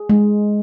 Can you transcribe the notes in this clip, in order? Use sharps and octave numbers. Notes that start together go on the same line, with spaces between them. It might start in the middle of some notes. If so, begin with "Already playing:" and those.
Already playing: G#4
G#3